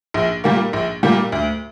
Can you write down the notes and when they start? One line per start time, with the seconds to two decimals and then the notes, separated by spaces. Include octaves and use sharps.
0.14 A#1
0.44 A#2 G3 A#3
0.73 A#1
1.03 A#2 G3 A#3
1.32 D2